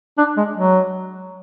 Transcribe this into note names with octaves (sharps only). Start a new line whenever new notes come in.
D4
G#3
F#3